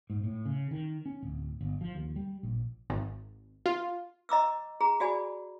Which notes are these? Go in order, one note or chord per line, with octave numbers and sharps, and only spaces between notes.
G#2
A2
C#3
D#3
C#4
D1
G1
F3
D#2
G3
A#1
G#1
F4
D#5 A#5 D6 E6
G#4 A#5
F#4 G#4 D5 G#5 B5